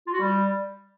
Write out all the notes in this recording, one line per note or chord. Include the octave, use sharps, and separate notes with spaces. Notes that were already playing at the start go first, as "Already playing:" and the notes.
F4
F#4
G3